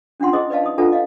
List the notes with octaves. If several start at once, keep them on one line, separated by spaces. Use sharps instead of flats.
C#4 D4 F4 F#5 C6
E4 G#4 C5 D#5 D#6
B4 D5 D#5 F5 A5
D#4 D#6
D4 F4 A4 B4 F#5 A5
D#5 F5